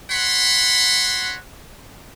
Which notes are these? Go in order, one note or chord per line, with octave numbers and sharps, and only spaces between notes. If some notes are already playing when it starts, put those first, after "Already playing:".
F#4 C#5 F#5 B5 C6